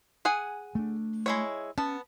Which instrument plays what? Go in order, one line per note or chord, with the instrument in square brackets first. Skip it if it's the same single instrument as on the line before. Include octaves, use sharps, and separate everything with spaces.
[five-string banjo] G#4 F#5 G#5
[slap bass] A3 D4
[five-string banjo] G#3 E4 C#5
[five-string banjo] B3 A5 [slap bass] C#4